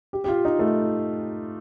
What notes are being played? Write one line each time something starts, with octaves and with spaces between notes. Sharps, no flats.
G4
G4
F4
D#4
A3